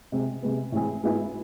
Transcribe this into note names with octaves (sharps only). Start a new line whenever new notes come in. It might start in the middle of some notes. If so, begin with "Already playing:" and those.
C3 G#3 C4
C3 G#3 B3
A2 E3 G#3 C4 G#4
G#2 G#3 B3 E4 G#4